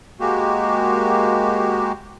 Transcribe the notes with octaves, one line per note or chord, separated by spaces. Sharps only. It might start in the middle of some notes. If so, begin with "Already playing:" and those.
G#3 A#3 F#4 G4